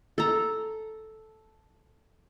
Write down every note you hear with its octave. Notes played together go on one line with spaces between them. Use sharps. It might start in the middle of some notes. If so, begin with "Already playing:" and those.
A4 A#5